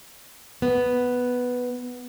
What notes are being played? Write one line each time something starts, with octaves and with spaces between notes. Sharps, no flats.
B3